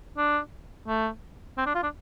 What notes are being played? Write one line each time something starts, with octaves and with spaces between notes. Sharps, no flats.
D4
A3
C4
D4
F4
D4